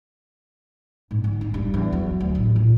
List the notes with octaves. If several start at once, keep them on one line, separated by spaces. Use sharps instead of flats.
G#2
D3
D#4
G2
E2
F#3
D2
A1
A#2